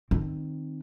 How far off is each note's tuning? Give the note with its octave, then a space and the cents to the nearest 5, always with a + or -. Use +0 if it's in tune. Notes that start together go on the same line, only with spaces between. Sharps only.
D#3 -20 C4 +0